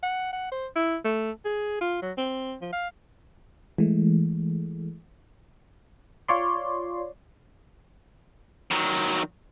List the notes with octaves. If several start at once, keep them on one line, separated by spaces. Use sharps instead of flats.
F#5
F#5
C5
E4
A3
G#4
F4
F#3
C4
F3
F5
E3 G#3 A3
F4 C#5 D5 C6
D#3 F#3